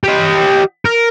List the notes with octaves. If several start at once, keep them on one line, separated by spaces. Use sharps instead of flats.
G4 D#5
A#4